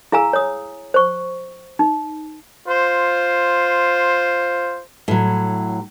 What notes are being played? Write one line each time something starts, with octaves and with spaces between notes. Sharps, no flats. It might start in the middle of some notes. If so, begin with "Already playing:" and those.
E4 G#4 F5 G#5 A#5 E6
C#5 D#6
C5 C#6
D#4
F4 C5
A2 F#3